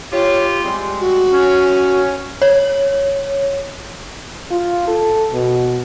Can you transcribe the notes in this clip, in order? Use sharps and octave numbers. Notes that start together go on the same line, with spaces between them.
F4 G4 C#5
G3 G#3 C4 C6
F#4
C#4
C#5
F4
A4
B2